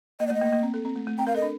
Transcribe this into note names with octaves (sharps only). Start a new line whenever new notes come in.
A#3 D#5
D5
A3
D#5
A#3
A#3
C4
A4
C4
A3
A3
C4 G5
A#4 F5
A4 D#5
D4